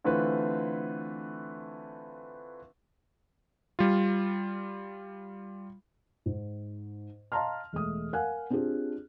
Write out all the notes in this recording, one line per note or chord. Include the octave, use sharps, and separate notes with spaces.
D3 E3 A3 C4 F4 B4
G3 F4
G#2
D#5 F5 A5 A#5 C6 F6
E1 G#3 A3 D#6
A#4 F5 F#5 G#5 F#6
C4 D4 F4 G4 G#4